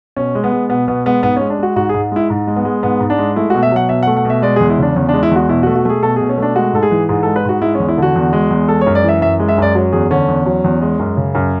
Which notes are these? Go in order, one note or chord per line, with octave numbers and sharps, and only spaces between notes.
B2 C#4
G#3
B3
G#3
B2 B3
B2 B3
G#3 B3
G#2 B3
C#4
G#3
D4
G#3 F#4
G#2 F#4
G#4
G#2
G#3 E4
G#2
G#3
B3
G#3
G#2 B3
G#2
D4
G#3
A3 E4
B2 F#4
E5
F#3 F#5
B2 E5
F#5
A3
F#5
B2 E5
G#3 D5
E2 G#4
E4
C#3 D4
E2 C#4
D4
G#3
E4
E2 F#4
B2 E4
F#4
A3
F#4
A3 G#4
B2 A4
B2 G#4
C#4
A3 D4
G#3 F#4
G#2 A4
G#4
E3
G#2 G#4
G#3 A4
B4
G#2 F#4
G#3 E4
C#4
E2
E4
D3 F#4
E2
G#3
E2
G#3 A4
C#5
F#2
D5
E3 E5
F#2 E5
G#3
E5
F#2 D5
F#3
E2 G#4
D3 C#4
E2
F#3
E2
G#3
F#2
C#3
F#2